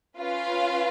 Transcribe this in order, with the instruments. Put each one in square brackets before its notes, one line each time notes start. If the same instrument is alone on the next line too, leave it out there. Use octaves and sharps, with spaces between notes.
[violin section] C#4 F4 B4 F5